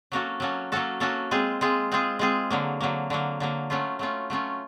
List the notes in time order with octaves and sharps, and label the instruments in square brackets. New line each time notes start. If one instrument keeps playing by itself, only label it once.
[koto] F#3 A#3 C#4 F#4 A4
F#3 A#3 C#4 F#4 A4
F#3 A#3 C#4 F#4 A4
F#3 A#3 C#4 F#4 A4
G#3 C4 F4 G#4
G#3 C4 F4 G#4
G#3 C4 F4 G#4
G#3 C4 F4 G#4
D3 F#3 A#3
D3 F#3 A#3
D3 F#3 A#3
D3 F#3 A#3
F#3 A3 C#4 F4
F#3 A3 C#4 F4
F#3 A3 C#4 F4